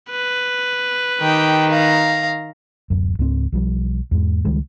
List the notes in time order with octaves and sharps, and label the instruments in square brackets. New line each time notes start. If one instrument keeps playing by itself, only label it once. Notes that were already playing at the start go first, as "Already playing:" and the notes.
[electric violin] B4
[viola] D#3 [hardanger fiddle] G4 G5
[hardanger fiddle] F5 A#5
[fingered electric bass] D1 F#2
C#2 G#2 C4
B1 F3 G3
E2 G#2 G#3
C#2 D#3 G3 G#3